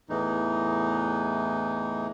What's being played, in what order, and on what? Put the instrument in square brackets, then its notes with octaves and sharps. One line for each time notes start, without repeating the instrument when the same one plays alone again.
[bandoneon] E2 A2 E3 D#4